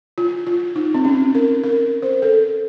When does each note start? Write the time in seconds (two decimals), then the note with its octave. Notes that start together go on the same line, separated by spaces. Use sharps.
0.18 F4
0.47 F4
0.76 D#4
0.94 C4
1.05 C#4
1.35 A#4
1.63 A#4
2.02 C5
2.22 A4